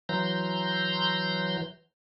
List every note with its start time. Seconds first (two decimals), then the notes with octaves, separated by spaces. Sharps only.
0.09 E3 F#3 A#5 C6 G6